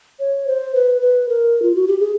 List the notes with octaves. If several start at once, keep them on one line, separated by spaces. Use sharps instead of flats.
C#5
C5
B4
B4
A#4
F4
F#4
G4
G#4